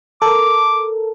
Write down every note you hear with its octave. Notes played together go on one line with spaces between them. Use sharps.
A4 A#4 D6